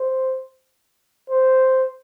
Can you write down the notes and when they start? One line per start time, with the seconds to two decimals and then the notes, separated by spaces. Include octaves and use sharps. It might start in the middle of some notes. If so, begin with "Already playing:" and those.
Already playing: C5
1.30 C5